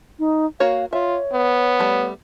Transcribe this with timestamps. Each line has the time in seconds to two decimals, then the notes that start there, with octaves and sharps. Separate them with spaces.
0.19 D#4
0.60 A#3 F#4 C#5 F5
0.93 F4 C#5 E5
1.33 B3
1.79 G3 A3